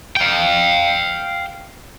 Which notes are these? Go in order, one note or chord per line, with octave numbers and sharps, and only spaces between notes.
F5 G5